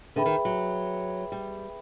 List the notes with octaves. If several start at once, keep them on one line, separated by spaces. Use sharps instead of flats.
D3 G#4 B4 E5 G5 B5
D#3
F#3
G3